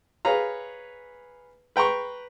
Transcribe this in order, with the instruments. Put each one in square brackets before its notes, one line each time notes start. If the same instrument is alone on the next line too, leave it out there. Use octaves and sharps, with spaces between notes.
[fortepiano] G#4 B4 C#5 F5 A#5
B4 G5 A#5 C6 C#6